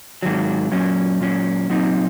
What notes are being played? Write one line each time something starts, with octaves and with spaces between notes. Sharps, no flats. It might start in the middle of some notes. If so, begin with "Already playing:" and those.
G#2 D#3 F#3
A#2 F#3 C#4
A#2 F#3 C#4
A#2 F#3 C4 D#4